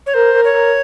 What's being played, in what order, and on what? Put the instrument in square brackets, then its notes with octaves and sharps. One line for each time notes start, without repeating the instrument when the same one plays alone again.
[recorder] C#5
[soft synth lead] A#4 [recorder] C5
[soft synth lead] A#4
[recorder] C#5
[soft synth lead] A#4